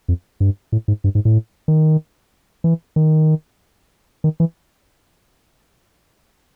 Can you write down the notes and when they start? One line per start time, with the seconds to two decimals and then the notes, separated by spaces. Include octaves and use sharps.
0.08 F2
0.40 G2
0.72 A2
0.88 G#2
1.04 G2
1.15 G#2
1.25 A2
1.68 D#3
2.64 E3
2.96 D#3
4.24 D#3
4.40 E3